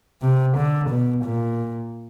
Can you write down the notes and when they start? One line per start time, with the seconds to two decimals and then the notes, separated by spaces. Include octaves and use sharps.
0.22 C3
0.57 D3
0.90 B2
1.25 A#2